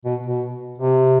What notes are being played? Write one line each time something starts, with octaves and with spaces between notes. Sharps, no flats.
B2
B2
C3